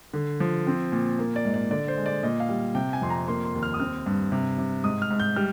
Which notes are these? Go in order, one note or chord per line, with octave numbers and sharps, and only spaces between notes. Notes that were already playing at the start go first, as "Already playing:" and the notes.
D3
F3
C4
A#2
A#3
D5
G#2
D5
D3 D5
C5
G#3
D5
A#2 D#5
F5
G3
C3 G5
G#5
F2 C6
A#5
A#3 C6
C6
D#2
F6
D#6
C4 F6
G2
C3
C3
G#2 D#6
F6
G#2
G6
G3 F6